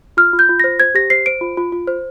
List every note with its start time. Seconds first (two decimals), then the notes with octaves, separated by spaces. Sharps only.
0.17 F4 F6
0.33 F4
0.39 G6
0.49 F4
0.60 C5 A#6
0.80 C5 G#6
0.95 G4 A#6
1.10 C5 C7
1.26 C5 D7
1.41 F4
1.57 F4
1.72 F4
1.88 C5